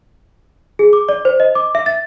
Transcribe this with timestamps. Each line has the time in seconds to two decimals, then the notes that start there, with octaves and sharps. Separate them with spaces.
0.79 G#4
0.93 D6
1.09 D5
1.25 C5
1.40 D#5
1.55 D6
1.75 E5
1.86 A6